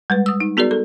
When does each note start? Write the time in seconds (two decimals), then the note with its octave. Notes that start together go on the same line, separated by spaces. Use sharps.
0.10 G3 G#3 B4
0.26 D#6 E6
0.40 D#4
0.57 B3 F#4 G#4 A#4 D5
0.71 A4